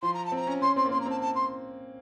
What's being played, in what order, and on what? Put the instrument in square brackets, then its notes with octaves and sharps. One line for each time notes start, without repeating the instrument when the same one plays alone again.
[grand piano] F3 [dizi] C6
[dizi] A#5
A5
[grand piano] C4 [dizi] A#5
[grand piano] C#4
[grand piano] C#4 [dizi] C6
[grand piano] C4 [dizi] C6
[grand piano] A#3
[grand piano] C4 [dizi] C6
[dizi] A#5
[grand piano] C4 [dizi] A5
[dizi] A5
C6